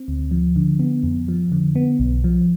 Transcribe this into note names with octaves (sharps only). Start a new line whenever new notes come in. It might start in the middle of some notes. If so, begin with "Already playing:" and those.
Already playing: C4
D2
F3
D3
B3
F2
F3
D3
B3
B1
F3